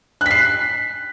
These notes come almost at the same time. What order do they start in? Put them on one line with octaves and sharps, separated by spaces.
F#6 B6 C7